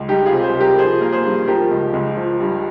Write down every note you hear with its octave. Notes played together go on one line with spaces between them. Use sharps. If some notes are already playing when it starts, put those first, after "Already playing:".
Already playing: C#2
G3 D#4 G4
F4 G#4
C3
G#4 C5
G3
G4 A#4
F3 G#4 C5
A#3
G#4 C5
G2
F3 G4 A#4
C#2
C#2
F3
G2